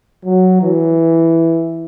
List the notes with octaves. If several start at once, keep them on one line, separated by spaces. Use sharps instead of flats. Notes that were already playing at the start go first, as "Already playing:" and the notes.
F#3
E3